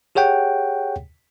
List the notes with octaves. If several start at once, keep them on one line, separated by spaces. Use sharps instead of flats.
G4 G#4 C#5 F#5 G5